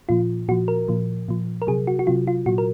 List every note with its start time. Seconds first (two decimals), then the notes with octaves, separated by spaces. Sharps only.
0.09 A#2 F3 F4
0.48 A#2 F#4
0.51 F3
0.68 A#4
0.88 A#2 F3
1.28 A#2 F3
1.62 A#4
1.67 C3 F#3 G#4
1.87 F#4
1.99 F#4
2.07 C3 F#3 F4
2.27 F4
2.46 A#2 F#3 F#4
2.58 A#4